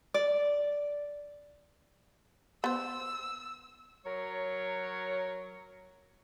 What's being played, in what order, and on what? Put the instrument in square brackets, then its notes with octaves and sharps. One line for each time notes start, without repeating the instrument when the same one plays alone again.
[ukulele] D5
[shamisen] B3 C5 [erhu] E6
[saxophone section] F#3 A#4 C#5